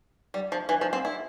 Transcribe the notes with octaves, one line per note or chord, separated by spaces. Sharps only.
G3
F3
E3
F3
C4
E4